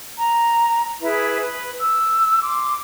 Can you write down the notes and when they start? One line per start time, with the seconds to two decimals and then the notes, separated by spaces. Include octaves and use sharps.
0.18 A#5
1.02 E4 G#4 B4 E5
1.43 B4
1.80 E6
2.42 C6 D6